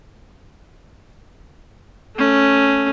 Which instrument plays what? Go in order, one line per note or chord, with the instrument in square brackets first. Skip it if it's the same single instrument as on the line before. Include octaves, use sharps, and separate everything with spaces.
[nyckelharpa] A3 C#4